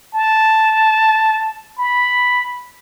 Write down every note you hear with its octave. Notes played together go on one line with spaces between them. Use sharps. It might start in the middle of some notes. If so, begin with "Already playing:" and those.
A5
B5